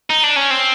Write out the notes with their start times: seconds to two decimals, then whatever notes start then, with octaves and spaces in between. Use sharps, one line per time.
0.10 D#4
0.23 D4
0.36 C#4
0.51 C4